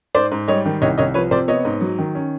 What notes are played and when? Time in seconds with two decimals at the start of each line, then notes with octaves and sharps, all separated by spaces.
0.15 G#2 C5 D5
0.32 G#2
0.48 G3 C#5 D#5
0.65 D#3
0.82 C2 C#5 D#5
0.98 C2 C#5 D#5
1.14 F3 B4 C#5
1.31 C3 C5 D5
1.48 B3 C#5 D#5
1.65 G#2
1.81 F#3
1.99 D#3
2.15 C#4